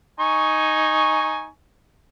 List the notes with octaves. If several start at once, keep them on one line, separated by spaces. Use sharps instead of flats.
D#4 G#5 C#6